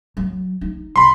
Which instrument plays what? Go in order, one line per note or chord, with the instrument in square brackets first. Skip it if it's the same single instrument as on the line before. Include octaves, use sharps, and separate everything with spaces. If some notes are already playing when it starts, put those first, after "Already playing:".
[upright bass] F#3
D#4
[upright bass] C2 [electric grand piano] B5 C6